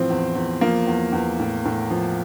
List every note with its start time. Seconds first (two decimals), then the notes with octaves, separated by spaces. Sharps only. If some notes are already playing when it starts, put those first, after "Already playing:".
Already playing: A2 E3 F3 C4
0.10 E2
0.35 E2
0.61 F3 A#3
0.87 E2
1.12 E2
1.40 A2
1.65 A2
1.91 F3